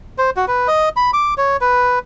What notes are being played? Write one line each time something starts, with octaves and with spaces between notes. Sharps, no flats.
C5
F#4
B4
D#5
B5
D6
C#5
B4